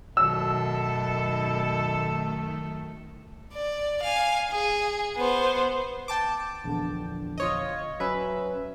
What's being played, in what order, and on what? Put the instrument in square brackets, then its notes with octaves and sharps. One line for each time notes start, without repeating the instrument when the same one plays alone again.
[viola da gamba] F#2 A4 [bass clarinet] B2 [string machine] D#3 A3 [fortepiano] E6
[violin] D5
F5 G#5
G#4
B3 C5
[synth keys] G5 A5 D6
[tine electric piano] A#1 E2 D3
[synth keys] F4 C#5 D#5
[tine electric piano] F#3 C#4 [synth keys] B4 E5